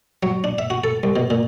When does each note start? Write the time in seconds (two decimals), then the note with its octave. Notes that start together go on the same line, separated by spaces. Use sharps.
0.23 F#3
0.44 D4
0.58 E5
0.70 F#4
0.84 A4
1.03 C2
1.16 B2
1.30 A#2